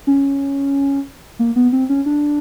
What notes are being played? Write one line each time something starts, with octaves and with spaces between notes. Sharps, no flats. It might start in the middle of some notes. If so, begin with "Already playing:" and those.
C#4
A#3
B3
C4
C#4
D4